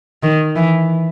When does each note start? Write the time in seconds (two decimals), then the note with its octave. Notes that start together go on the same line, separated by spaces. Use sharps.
0.23 D#3
0.56 E3